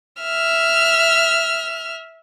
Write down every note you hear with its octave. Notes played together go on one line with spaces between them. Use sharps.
E5 F6